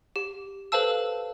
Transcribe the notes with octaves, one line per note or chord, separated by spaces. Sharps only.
G4
A4 B4 C5 F5 A5 E6